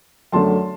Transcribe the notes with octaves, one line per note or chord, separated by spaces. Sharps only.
F#2 D3 A3 A5 C6